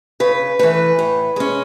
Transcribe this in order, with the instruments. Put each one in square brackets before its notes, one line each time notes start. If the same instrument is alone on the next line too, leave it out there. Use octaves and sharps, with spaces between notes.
[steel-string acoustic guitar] C#3 B4
E3 A3 B4
A2
G#3 C#4